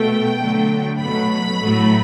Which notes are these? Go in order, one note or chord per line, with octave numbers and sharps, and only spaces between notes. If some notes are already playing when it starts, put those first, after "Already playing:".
Already playing: B2 A3 G5
D3 F#3 A3
B2 F#3 A3 B5
A2 F#3 A3